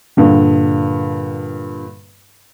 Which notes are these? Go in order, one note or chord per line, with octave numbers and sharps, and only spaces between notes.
G2 A#2 D3